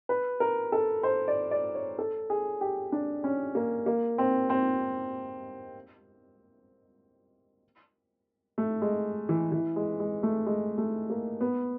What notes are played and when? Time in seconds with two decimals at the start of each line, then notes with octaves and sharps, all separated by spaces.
0.09 B4
0.40 A#4
0.72 A4
1.03 C5
1.28 D5
1.51 D5
1.75 C#5
1.99 A4
2.30 G#4
2.61 G4
2.92 D4
3.24 C#4
3.55 A#3
3.86 A#3
4.18 C4
4.50 C4
8.58 A3
8.82 G#3
9.29 E3
9.52 E3
9.76 G#3
10.00 G#3
10.23 A3
10.46 G#3
10.78 A3
11.10 A#3
11.41 B3